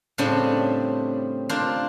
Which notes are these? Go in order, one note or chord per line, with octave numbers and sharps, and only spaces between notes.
A2 C#3 G3 C4 D4
D4 F4 A#4 C5